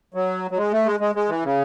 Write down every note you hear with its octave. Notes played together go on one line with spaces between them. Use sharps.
F#3
F#3
G#3
A3
G#3
G#3
G#3
E3
C#3